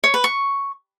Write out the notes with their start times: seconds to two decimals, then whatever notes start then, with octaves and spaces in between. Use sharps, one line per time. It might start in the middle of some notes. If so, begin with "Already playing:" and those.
0.04 C#5
0.14 B4
0.24 C#6